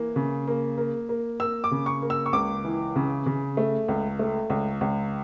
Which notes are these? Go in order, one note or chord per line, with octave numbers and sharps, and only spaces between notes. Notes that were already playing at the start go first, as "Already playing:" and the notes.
Already playing: E3 A#3
C#3
A#3
A#3
A#3
A#3 E6
D6
C#3
C#6
A#3
E6
C#6
C#2 D6
E3
C#3
C#3
A3
C#2
A3
C#2
C#2